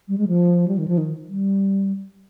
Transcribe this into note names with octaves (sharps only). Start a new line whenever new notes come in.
G3
G#3
F3
G3
D#3
F3
D#3
G3